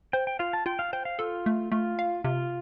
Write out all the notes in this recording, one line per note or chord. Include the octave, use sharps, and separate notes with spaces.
C5 G5
G5
F4 F5
A5
F4 G5
F5
C5 G5
F5
F4 A4
A3
A3 F4
F5
C3 F4